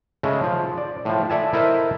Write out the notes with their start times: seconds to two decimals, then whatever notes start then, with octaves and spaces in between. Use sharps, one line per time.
0.23 C#3 G#3 A3
0.43 F3
0.78 D5
1.05 A2 F3
1.30 A4 D5 E5 G#5 A5
1.53 E4 A4 A#4 C5 D#5 E5